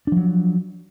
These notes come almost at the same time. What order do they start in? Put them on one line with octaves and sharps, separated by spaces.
D4 F3 F#3